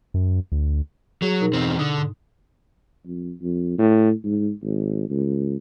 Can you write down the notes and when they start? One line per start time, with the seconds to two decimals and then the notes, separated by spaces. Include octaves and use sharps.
0.14 F#2
0.52 D2
1.22 F#3 G#4
1.41 B2 D#4 A#4
1.53 E2 C4
1.79 D3 D#6
1.98 G#2
3.06 F2
3.42 F2
3.78 A2
4.24 G#2
4.63 G#1
5.10 C#2